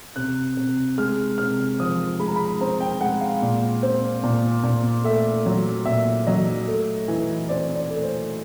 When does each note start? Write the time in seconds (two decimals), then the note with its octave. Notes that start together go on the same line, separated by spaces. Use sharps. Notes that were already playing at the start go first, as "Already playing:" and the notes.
0.16 C3 F#6
0.57 C3
0.98 G#3 F6
1.38 C3 F6
1.80 F3 D#6
2.19 G#3 B5
2.28 A#5
2.36 B5
2.61 C4 A#5
2.81 G5
3.01 G#3 F#5
3.21 F5
3.42 A#2
3.83 C4
4.23 A#2
4.63 A#2
5.04 A3 E5
5.46 F#3
5.86 A#2 E5
6.27 F#3 D#5
6.68 A3
7.08 E3
7.49 C4 D5
7.76 D5
7.90 A3
8.03 C5